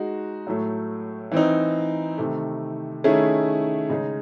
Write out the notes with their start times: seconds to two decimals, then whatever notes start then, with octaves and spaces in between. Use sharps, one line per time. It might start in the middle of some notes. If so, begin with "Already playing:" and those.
Already playing: G#3 D#4 F#4
0.47 A2 F#3 A3
1.32 E3 C4 D#4
2.18 C3 D#3 A3
3.04 D#3 A3 C#4 E4 G#4
3.90 C#3 G#3 D#4 G#4